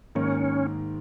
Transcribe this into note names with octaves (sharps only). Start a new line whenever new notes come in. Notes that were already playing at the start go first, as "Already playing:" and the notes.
G#2 D#3 A#3 C#4